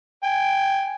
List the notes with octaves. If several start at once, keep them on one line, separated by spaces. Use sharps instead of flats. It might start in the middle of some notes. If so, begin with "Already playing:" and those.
G5 G#5